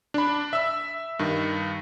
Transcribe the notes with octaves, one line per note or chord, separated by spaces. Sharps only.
D4 B5
E5 E6
G2 D#3